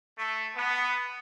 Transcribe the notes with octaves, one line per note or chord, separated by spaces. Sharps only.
A3
B3